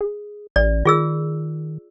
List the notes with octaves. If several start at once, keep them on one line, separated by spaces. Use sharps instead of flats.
G#4
A1 D5
D#3 F4 G#4 E6